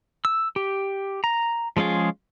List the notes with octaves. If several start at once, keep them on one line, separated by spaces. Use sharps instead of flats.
E6
G4
A#5
F3 G#3 C#4 F4 G#4